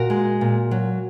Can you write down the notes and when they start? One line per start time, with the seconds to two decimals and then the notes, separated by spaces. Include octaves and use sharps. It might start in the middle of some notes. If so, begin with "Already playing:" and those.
Already playing: A#2 F#4 A#4
0.10 G#3
0.41 A#2
0.71 F#3